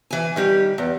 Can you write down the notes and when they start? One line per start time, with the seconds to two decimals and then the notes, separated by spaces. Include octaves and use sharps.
0.10 E3 G#5
0.36 D#3 G3 G4
0.78 E2